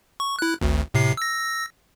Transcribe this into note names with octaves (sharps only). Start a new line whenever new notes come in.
C#6
E4 F#6
G#1 D2
A2 C3 C7
E6 A#6